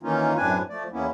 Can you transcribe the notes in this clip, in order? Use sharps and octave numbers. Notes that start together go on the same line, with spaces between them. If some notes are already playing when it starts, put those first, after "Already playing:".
D#3 E3 A#3 C#4 D#4 F4
F#2 A2 C4 D4 B4 G#5
F3 A3 D5
E2 A#3 B3 C#4 E4